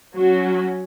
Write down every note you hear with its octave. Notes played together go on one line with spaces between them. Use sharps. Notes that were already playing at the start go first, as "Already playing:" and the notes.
F#3 C#4 F#4